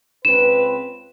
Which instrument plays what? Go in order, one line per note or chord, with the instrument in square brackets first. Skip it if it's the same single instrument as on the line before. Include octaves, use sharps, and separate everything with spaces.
[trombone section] C#2 C4 B4 [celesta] E7